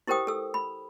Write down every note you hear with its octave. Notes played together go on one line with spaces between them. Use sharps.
E4 G4 A#4 C5 G5 D#6
A4 E6
B5